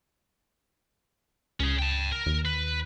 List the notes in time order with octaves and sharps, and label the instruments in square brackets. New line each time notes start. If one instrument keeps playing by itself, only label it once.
[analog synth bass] C#2 [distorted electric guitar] C#4 G#4
[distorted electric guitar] G5 A5
A#4
[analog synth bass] D#2
[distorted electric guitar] B4